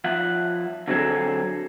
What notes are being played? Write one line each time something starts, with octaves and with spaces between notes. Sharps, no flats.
F3 E5 F#5
D3 F#3 C4 G#4 A4